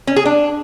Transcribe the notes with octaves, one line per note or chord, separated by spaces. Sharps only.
C#4
G#4
D4